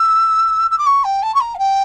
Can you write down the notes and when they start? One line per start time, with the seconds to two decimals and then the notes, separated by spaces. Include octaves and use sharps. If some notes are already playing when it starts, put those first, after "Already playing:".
Already playing: E6
0.70 E6
0.78 D6
0.86 C#6
1.04 G5
1.22 A5
1.34 C#6
1.40 A#5
1.54 F5
1.58 G5